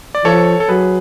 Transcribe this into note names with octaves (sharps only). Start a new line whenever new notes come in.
D5
F3 A4 C#5
A4
F#3 G#4 B4